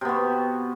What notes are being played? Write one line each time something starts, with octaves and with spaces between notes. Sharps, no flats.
C3 B3 F#4